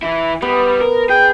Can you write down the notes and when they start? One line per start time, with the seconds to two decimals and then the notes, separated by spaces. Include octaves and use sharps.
0.02 E3 E4
0.42 G3 B3
0.81 A#4
1.09 G#4 G5